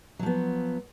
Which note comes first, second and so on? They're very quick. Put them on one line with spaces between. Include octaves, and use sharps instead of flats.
F#3 F3 B3